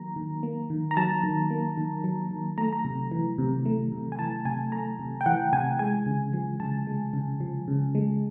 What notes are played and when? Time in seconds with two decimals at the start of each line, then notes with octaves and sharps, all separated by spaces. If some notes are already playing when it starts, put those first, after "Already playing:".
Already playing: D#3 F#3 A#3 A#5
0.16 D#3
0.43 A#3
0.70 D#3
0.91 A#5
0.97 F#3 A5
1.24 D#3
1.50 A#3
1.77 D#3
2.04 F#3
2.31 D#3
2.58 A3 A#5
2.73 A#5
2.85 C3
3.12 E3
3.38 C3
3.65 A3
3.92 C3
4.12 G#5
4.19 E3 A5
4.45 C3 G#5
4.72 A3 A#5
4.99 C3
5.21 G5
5.26 E3 F#5
5.53 C3 G#5
5.79 G#3 G#5
6.06 C#3
6.33 F3
6.60 C#3 A5
6.87 G#3
7.14 C#3
7.40 F3
7.68 C#3
7.95 G#3